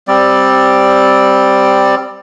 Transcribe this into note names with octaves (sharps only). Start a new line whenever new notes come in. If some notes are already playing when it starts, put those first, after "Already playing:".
G3 C4 D5